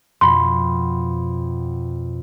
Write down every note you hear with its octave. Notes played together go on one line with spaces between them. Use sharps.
F2 B2 B5 C6